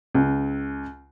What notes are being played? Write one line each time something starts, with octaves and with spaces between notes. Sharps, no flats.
C#2